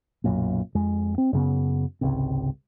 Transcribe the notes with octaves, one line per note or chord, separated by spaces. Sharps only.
B1 F#2 A#2
F2 G#3
C4
F#2 C#3 B3
G#1 C#2 C3